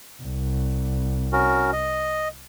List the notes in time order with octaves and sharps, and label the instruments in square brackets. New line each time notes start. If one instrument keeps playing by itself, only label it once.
[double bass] C2
[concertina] C#4 F#4 A#4
D#5